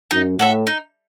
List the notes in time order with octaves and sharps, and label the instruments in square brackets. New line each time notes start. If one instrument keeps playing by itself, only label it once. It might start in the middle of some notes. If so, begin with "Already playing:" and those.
[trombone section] F#2 [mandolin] D#4
[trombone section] A2 [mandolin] F#4 A4 E5
[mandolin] D#4